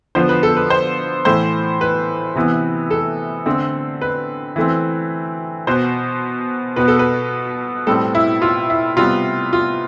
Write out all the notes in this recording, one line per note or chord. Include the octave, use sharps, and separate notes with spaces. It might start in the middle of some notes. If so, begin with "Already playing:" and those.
D3 F3 B3 C5
B4
A4
B4
C5
A2 E3 A3 C5
B4
C3 E3 B3
A4
D3 A3 C4
B4
E3 A3 C4
B2 B3 C5
B2 B3 B4
A4
B4
A2 G3 C4 A4
E4
F4
E4
C3 G3 B3 F4
F4